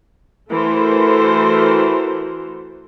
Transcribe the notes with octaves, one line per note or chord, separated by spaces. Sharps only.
E3 A3 F#4 A4 A#4 C5